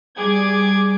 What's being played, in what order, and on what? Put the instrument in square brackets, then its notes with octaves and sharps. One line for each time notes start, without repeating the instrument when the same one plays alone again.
[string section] G3 G#4 D6 G#6